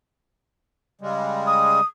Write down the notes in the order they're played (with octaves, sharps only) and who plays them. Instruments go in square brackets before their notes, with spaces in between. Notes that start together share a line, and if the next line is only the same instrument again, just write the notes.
[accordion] C#3 G3 G#3
[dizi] D#6